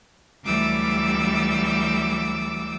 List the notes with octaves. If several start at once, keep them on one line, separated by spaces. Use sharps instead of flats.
D2 E3 F#3 G3 D6 E6